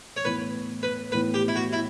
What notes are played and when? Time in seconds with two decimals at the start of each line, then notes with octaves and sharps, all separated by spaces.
0.16 C#5
0.25 A2 E3 B3 B4
0.83 B4
1.12 A2 E3 B3 B4
1.34 G4
1.48 E4
1.56 F#4
1.73 E4